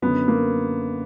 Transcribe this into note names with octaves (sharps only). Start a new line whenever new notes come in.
F#2 D3 B3
A#3